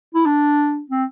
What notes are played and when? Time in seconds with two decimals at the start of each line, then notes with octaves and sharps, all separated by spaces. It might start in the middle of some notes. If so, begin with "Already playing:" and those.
0.14 E4
0.26 D4
0.90 C4